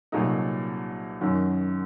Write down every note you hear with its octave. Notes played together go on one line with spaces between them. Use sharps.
C2 A#2 F#3 A3 D#4
F#2 D#3 F#3